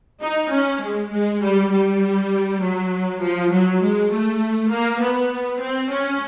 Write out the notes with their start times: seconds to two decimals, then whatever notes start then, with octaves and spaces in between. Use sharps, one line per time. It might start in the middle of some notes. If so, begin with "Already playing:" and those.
0.22 D#4
0.51 C#4
0.82 G#3
1.12 G#3
1.42 G3
1.72 G3
2.61 F#3
3.21 F3
3.50 F#3
3.81 G#3
4.11 A3
4.70 A#3
5.00 B3
5.60 C4
5.90 C#4